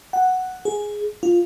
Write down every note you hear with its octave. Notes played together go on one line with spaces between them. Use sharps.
F#5
G#4
F4